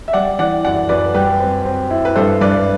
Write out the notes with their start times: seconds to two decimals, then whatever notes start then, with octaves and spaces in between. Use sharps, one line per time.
0.08 E5
0.13 G3 D5 F#5
0.39 E3 D5 F#5
0.64 F#2 D5 F#5
0.89 F#2 B4 D5
1.15 G3 G4 B4
1.40 C4
1.65 C4
1.91 E4
2.05 B4
2.16 G2 A4 C5
2.41 G2 B4 D5